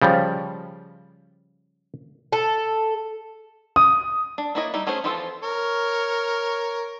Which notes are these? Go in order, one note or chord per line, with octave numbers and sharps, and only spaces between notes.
C#3 F3 G3
A4
D#6
D4
A#3 D4 E4 C#5 D#5
G3 D#4 E4
A3 C#4 G#4 C5
E3 F3 C4 F4 A4
A#4 C#5